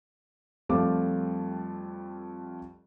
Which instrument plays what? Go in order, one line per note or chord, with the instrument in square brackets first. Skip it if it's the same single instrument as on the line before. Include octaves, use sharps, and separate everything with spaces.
[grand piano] F2 G3 A3 C4 F4 D6